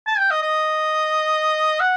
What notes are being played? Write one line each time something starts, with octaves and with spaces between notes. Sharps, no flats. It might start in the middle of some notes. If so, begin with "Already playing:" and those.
A5
G5
D#5
D#5
F#5